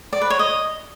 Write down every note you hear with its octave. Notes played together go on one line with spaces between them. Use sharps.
D5
B4
C#5
D#5